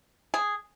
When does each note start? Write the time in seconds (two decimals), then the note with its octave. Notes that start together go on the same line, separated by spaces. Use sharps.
0.34 G#4